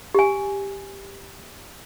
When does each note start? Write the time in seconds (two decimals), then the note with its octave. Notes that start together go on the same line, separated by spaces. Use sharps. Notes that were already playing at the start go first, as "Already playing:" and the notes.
0.15 G4 G#5